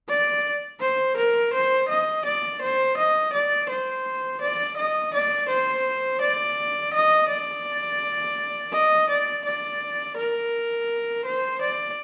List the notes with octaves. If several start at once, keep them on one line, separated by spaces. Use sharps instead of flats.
D5
C5
A#4
C5
D#5
D5
C5
D#5
D5
C5
D5
D#5
D5
C5
D5
D#5
D5
D#5
D5
D5
A#4
C5
D5